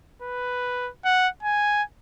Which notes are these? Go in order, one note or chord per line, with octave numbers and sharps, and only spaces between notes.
B4
F#5
G#5